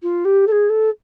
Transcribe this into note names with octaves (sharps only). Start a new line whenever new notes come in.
F4
G4
A4
G#4
A4